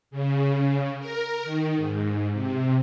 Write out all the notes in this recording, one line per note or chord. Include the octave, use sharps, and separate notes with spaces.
C#3
A#4
D#3
G#2
C3